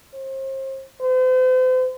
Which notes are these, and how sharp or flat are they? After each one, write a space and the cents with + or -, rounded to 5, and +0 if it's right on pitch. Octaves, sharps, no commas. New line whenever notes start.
C5 +35
C5 -40